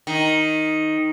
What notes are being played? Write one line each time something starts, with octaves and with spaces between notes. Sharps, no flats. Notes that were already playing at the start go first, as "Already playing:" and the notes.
D#3